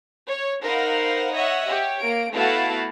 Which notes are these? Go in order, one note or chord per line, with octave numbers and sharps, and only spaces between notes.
C#5
D#4 A#4 C5 F5 F#5 B5
C#5 D#5 E5 F#5
G4 C#5
A#3 D7
A3 B3 E4 F#4 F5 A5